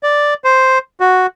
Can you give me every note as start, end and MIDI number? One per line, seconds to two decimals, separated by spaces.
0.03 0.34 74
0.44 0.78 72
1.00 1.26 66